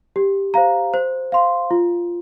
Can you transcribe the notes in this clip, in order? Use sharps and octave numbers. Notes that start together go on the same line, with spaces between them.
G4
C5 F5 A#5
C5
F5 C6
F4